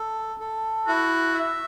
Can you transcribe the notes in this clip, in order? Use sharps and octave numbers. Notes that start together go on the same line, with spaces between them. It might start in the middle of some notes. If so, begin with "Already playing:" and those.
Already playing: A4
A4
E4 F#4
E5